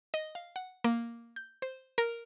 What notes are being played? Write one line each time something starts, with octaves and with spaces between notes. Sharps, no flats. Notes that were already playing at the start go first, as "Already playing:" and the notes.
D#5
F5
F#5
A#3
G6
C5
A#4